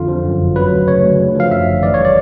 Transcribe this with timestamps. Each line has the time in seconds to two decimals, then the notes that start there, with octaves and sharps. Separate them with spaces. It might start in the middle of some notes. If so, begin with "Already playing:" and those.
Already playing: F2 D3 F4
0.08 F3
0.24 F#2
0.40 G1
0.56 F#3 B4
0.72 D2
0.88 C#3 C#5
1.04 D2
1.19 D3
1.35 F3 F5
1.51 F#2 E5
1.67 G1
1.83 E3 D5
1.94 C#5
2.00 G3 D5